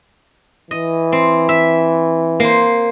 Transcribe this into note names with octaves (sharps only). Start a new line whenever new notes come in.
E3 D#5
C4
E5
A#3 C5